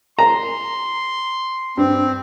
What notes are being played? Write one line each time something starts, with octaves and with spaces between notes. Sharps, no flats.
A#5 C6
G2 C4